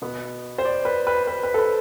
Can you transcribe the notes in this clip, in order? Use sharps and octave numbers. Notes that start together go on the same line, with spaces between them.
B2 B3
C5
D5
B4
B4
B4
B4
A4
B4